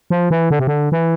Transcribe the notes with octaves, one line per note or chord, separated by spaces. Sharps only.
F3
E3
D3
C3
D3
E3